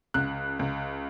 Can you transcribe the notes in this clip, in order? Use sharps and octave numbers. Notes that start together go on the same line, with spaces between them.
C#2 F#6
C#2